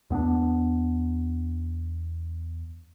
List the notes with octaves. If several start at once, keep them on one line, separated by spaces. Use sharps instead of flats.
E2 B3 C4 D4